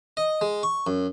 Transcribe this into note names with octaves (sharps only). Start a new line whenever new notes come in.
D#5
G#3
C#6
F#2